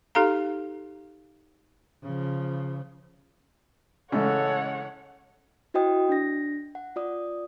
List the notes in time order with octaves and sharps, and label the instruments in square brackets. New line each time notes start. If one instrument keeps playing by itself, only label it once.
[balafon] D#4 G4 A4 F5 A#5
[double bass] C#3 F3
[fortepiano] A1 C#3 [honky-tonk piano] G#3 A3 [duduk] A4 [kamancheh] C#5 F#5
[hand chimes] E4 F#4 C5 D#5 G5 D#6
D4 A#6
F#5
F4 D5 D#6